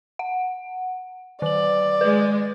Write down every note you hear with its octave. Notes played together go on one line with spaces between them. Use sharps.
F#5
D#3 D5 F#7
G#3 B4